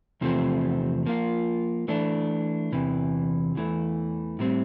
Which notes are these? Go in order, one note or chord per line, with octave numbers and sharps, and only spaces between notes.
E2 C3 F3 A3 C4
F3 A#3 F4
E3 A3 D4
E2 C3 E3
E2 E3 A3
A2 G3 C4